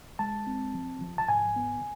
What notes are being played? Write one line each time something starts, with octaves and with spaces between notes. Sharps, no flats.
G#3 A5
C4
F3
F3
A5
G#2 G#5
B3